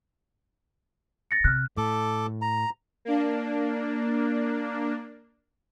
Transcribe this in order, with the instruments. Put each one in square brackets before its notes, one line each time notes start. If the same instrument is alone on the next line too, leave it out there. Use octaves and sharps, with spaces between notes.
[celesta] A6 A#6 C#7
[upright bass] C3 [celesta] F6 F#6
[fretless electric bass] A2 [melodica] A4 D6
[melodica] A#5
[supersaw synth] A#3 D4